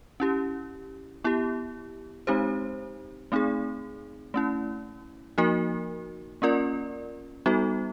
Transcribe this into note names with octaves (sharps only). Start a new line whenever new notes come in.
C#4 E4 G4
B3 E4 G4
G#3 C4 D#4 G4 C5
A3 C4 D#4 G#4
A3 C#4 E4
F3 A#3 D#4 F#4 A#4
A#3 C#4 F4 A#4 D5
G3 B3 D#4 F#4 A4